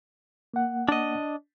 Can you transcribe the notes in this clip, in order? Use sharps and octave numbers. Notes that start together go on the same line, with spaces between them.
A#3 F#5
D4 D#5